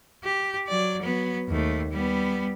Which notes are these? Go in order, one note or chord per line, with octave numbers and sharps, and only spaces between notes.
G4
F#3 D5
F#3 B3
D#2 A3
G3 B3